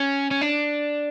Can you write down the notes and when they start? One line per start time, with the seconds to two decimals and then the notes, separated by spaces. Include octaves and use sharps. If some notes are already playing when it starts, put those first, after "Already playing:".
Already playing: C#4
0.31 C#4
0.41 D4